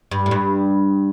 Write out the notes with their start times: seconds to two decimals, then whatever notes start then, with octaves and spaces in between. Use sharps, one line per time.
0.11 G2
0.26 A2
0.31 G2